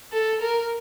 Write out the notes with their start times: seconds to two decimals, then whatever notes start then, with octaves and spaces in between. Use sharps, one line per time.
0.12 A4
0.42 A#4